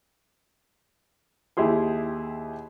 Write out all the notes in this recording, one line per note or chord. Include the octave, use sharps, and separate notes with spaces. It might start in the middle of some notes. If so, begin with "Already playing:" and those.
D#2 E4 G4 G#4 C6